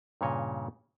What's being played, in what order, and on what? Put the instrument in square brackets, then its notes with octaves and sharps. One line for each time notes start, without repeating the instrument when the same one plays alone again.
[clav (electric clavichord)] G2 A#2 C#3 C#5 D#5